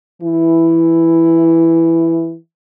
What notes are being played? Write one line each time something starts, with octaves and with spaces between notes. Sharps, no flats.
E3 E4